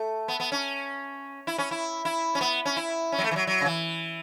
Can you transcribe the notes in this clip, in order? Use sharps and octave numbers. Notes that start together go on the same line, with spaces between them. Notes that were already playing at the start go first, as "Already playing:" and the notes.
Already playing: A3
B3
B3
C#4
E4
C#4
E4
E4
C#4
B3
C#4
E4
C#4
F#3
A3
E3
F#3
F#3
C#3
E3